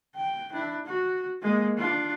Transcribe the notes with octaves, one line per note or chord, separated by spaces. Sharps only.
G5
D4 E4
F#4
G#3 A#3
D4 F4